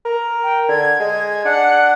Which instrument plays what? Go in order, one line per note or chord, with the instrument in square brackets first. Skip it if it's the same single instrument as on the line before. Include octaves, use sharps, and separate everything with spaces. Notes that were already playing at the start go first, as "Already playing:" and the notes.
[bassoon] A#4
[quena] G5
[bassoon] D3 [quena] G#6
[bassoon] G#3
[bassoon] D4 [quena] F#5